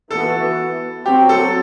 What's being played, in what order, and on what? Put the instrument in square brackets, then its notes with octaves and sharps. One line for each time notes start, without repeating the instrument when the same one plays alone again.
[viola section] E3 B3 F#4 [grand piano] A4
[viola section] F#3 C4 F#4 [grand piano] G4
[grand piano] A4